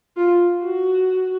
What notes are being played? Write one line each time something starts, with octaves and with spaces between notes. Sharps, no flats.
F4
F#4